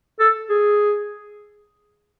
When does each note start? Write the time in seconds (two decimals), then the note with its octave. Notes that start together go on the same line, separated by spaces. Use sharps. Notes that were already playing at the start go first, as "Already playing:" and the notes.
0.20 A4
0.50 G#4